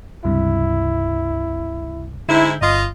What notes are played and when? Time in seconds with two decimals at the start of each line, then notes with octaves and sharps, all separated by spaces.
0.24 C#2 G2 C3 E4
2.28 G#2 D3 G#3 E4 G6
2.61 G1 F4 D#5